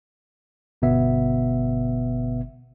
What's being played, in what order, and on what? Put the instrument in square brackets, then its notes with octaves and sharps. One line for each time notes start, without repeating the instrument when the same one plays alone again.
[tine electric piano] G1 B2 B3 E5